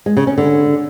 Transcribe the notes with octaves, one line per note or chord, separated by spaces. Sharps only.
G#3
C#3
C#4
D3